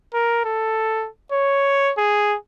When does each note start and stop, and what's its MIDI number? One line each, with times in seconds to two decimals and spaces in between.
0.14 0.42 70
0.45 1.08 69
1.32 1.93 73
1.98 2.36 68